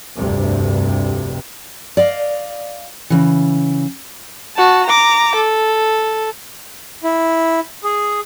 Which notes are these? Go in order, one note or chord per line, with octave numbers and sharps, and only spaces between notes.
F1 D2 G2 C3
D5 D#5 F5
C#3 E3
F#4 A5
A#5 D6
A4
E4
G#4